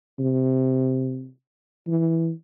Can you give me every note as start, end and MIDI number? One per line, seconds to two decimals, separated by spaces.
0.19 1.28 48
1.87 2.31 52